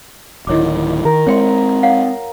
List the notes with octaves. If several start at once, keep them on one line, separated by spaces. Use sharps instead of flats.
D1 D#3 E4 C#5 D6
D#3 A#4
G#3 C4 C#5 G5 C6
C#5 F5 F#5